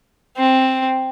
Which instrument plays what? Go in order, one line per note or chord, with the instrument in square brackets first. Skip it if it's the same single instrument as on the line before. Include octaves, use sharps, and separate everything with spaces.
[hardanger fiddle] C4